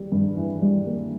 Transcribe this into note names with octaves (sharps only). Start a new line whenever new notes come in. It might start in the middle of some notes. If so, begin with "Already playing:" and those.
Already playing: G3
G2
E3
G3
A#3